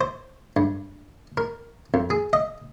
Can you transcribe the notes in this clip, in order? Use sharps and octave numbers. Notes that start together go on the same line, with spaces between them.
C5
G2
A#4
F2
G#4
D#5